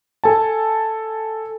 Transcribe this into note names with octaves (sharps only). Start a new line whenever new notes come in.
A4 G#5 A5